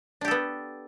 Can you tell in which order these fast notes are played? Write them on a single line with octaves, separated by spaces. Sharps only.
D4 G4 A4 B3